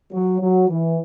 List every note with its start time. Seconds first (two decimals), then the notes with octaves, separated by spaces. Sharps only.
0.12 F#3
0.41 F#3
0.69 E3